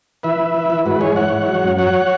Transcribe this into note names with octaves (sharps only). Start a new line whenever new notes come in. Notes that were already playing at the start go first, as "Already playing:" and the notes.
E3 B4 E5
E3
E3
E3
G#2 F#4 B4
E3 G#4 C#5
E3 C#5 F#5
G#2
F#3
F#2
F#3 C#5 F#5